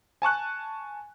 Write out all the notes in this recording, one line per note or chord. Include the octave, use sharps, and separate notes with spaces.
G#5 A5 C#6 F#6